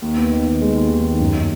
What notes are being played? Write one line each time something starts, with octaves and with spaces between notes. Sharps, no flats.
D#2
B3
D#3
D#3
G#3
D#2
D#3
D#3
F#2